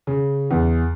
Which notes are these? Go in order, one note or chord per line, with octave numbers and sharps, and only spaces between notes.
C#3
E2